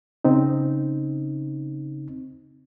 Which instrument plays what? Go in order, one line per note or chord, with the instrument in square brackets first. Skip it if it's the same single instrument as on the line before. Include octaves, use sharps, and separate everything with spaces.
[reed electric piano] C#3 C4 D#4